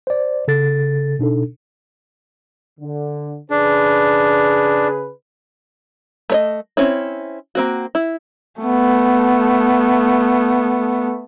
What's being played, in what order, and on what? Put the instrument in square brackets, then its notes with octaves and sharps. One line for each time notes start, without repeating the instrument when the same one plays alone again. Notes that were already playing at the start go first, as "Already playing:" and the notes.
[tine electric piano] C5 D5
C#3 A4 A6
B2 D4 D#4 A4
[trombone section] D3
[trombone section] C#3 G#4 B4 [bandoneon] D4
[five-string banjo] A3 C#5 D#5
C4 C#4 E4
A#3 C4 F#4
E4
[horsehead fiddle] A3 B3